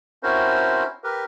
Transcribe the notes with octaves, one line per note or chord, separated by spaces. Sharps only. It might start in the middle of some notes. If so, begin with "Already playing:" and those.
C4 C#4 E4 F#4 A#4 C5
G4 A#4 B4